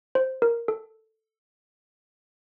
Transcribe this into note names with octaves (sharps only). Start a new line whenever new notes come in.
C5
A#4
A4